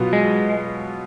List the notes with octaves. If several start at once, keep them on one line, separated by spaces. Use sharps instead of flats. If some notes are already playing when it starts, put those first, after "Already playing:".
Already playing: B2 F#3 B3 F4
G#3